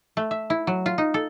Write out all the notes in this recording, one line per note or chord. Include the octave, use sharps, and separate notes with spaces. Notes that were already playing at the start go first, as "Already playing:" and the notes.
A3
E5
E4
F#3
F4
D#4
A4